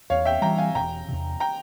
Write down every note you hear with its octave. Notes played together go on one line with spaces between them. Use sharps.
E2 C#5 F5
E5 G5
E3 G3 G5 A#5
F5 G#5
E1 G5 A#5
E2 C3
G5 A#5